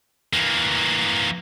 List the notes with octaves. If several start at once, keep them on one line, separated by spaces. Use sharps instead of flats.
E3 A#3